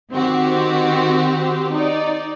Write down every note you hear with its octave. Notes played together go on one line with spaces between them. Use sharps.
D#3 C4 F#4 G4
D#4 D5